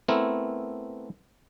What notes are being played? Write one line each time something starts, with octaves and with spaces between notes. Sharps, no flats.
A3 B3 C4 E4 A#4